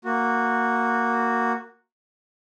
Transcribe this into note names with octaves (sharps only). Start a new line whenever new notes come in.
A#3 F#4